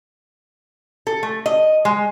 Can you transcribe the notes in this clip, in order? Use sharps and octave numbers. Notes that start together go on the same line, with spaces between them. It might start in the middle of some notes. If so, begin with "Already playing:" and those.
A4
A3
D#5
G#3